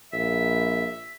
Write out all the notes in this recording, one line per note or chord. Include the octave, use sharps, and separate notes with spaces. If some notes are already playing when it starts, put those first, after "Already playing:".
A#1 E5